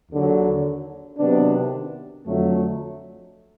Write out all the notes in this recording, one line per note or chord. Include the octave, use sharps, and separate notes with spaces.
D#2 D3 F#3
C3 D#3 F#3 B3 D4
F2 D3 F#3 A3